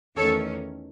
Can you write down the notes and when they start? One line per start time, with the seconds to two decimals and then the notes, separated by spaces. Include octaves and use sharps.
0.16 E2 D#3 A3 C#4 A4 C#5